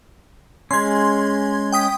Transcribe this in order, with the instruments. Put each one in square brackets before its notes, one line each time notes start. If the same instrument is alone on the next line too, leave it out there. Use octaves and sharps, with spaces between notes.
[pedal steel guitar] G#3 C#4 [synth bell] C6 G#6
[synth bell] G5 D#6 B6